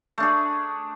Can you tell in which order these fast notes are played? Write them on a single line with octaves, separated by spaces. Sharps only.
A3 D4 G#4